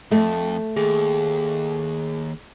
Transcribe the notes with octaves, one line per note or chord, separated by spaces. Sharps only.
F2 A3
D#2 G#4